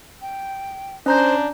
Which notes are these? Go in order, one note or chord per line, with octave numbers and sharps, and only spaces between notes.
G5
C#4 D4 C5 A#5 G6